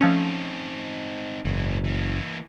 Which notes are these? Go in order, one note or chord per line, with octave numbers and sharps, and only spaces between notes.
F3 A3 C4 C#4 D#4
F#1 G#2 E3
E3 A#3